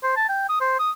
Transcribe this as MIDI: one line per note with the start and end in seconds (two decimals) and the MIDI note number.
0.03 0.13 72
0.16 0.27 81
0.29 0.49 79
0.49 0.60 87
0.61 0.78 72
0.79 0.91 87